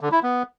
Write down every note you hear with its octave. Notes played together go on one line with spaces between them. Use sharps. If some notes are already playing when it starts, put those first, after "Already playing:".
D3
E4
B3